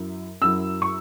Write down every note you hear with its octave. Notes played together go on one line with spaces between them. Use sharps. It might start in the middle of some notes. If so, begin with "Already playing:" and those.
Already playing: F#2 F#3 E4
F#2 F#3 E4 E6
C#6